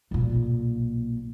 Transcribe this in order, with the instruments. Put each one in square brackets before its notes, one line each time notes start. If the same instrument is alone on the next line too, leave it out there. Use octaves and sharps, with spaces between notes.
[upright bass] B1 A#2